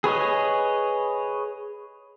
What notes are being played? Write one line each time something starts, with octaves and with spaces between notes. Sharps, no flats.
G#4 B4 C#5 D#5